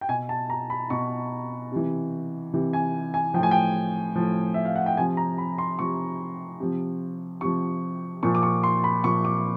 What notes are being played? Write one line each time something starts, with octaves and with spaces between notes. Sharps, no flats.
G5
B2 G#5
A5
A#5
B5
B2 C#6
C3 E3
C3 E3
G#5
G#5
A2 F3 G5 G#5
G5
A2 F3
E5
F5
F#5
G5
C3 F3 G#5
A#5
B5
C6
C3 F3 C#6
C3 F3
C3 F3 C#6
A#2 F3 C#6
D6
C#6
C6
B5
A#2 F3 C#6
D6